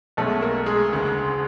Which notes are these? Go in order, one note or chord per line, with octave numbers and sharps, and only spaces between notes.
B1 B2 G#3 A3 C#4 A4
A#3 A#4
G#3 G#4
E1 D2 C#3